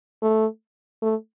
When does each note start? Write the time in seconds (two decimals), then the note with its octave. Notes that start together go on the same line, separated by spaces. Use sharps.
0.22 A3
1.02 A3